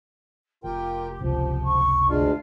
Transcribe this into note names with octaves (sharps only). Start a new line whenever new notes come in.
F1 F4 G4 A#4 G5
F#1 C#2 C3 F3
C#6
D2 G#3 D4 F4